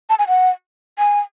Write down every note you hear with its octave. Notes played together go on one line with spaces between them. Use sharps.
A5
G#5
F#5
G#5